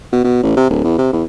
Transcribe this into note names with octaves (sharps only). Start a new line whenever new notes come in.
B2
B2
A1
C3
D1
E2
C3
E2